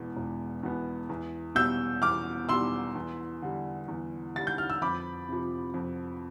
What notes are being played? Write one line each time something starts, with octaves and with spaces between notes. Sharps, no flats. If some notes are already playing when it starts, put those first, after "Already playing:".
Already playing: E1 E2 B2 B3
E1
E2 B2 B3
E2
B2 G3 E6 G6
E2 D6 F6
B2 G3 C6 E6
E2
D3 G3
E2
D3 G3 A6
G6
F6
E6
F2 B5 D6
C3 F3
F2